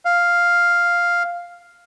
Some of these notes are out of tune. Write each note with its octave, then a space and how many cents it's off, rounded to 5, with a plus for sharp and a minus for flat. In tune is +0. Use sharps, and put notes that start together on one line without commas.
F5 +0